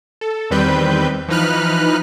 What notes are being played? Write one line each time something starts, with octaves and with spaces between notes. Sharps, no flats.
A4
E2 D#3 G3 C4 B4 G6
E3 F3 D#4 B4 F6 F#6